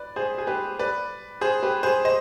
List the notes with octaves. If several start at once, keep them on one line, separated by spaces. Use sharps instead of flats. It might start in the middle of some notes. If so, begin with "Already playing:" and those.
Already playing: B4 D5
G#4 C5
G#4
G4 B4
B4 D5
G#4 C5
G4 B4
G#4 C5
C5 D#5